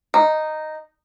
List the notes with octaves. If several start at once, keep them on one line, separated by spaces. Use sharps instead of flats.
D#4